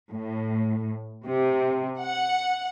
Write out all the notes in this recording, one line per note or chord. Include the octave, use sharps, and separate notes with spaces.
A2
C3
F#5